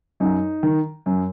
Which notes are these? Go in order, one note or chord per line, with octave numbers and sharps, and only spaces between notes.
F#2 D#4
D#3
F#2